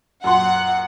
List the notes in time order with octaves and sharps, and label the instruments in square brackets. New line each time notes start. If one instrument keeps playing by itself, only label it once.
[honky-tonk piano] F#2 A#2 C6 [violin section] F#5